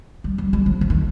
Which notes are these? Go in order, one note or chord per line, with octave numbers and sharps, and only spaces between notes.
G3
G3
G3
F3
F3
D#3